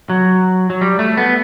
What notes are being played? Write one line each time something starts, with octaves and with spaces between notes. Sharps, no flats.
F#3
F#3
G3
A3
B3